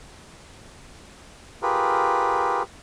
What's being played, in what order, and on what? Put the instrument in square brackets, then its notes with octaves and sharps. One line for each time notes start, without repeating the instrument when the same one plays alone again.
[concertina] F4 G4 G#4 A#4 B4